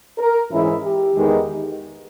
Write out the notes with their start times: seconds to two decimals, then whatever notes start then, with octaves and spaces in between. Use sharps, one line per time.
0.18 A#4
0.51 G#2 E3 G#3 C#4 E4
0.83 G4
1.15 E2 D#3 G#3 D#4